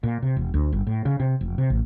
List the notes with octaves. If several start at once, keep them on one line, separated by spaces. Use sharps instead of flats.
A#2
C3
E1
D2
G1
A2
C#3
C3
F1
C3
A1